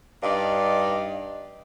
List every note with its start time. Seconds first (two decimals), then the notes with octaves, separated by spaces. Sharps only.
0.23 G2 D#4 D5 D#5 F5